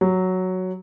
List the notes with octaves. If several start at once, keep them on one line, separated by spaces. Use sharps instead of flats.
F#3